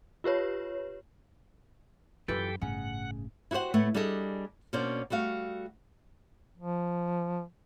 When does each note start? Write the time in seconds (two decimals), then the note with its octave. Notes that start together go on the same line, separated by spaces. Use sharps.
0.24 F4 G4 B4 C#5
2.28 F#2 E3 F4 G4 A4 B4 G5
2.62 G1 A2 C#3 F#5
3.51 E4 F#4 G4 C5 F#5
3.74 A2 A3 B3
3.94 G3 D4 G#4 A4 D#5
4.73 B2 A#3 C#4 D4 C5 D5
5.10 G3 A3 F#4 F5
6.58 F3